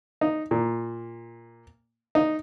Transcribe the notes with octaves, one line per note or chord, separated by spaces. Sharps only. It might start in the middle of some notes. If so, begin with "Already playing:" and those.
D#4
A#2
D#4